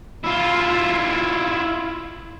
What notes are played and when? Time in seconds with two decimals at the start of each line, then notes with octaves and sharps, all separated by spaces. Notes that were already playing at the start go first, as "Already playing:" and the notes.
0.24 E4 F4